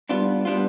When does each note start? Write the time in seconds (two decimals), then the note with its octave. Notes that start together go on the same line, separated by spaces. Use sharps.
0.09 G3 B3 D4 F4
0.45 G3 B3 D4 F4